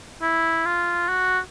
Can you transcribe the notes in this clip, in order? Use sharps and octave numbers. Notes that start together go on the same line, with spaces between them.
E4
F4
F#4